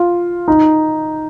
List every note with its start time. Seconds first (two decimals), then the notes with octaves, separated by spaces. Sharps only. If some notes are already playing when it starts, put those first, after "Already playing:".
Already playing: F4
0.48 D#4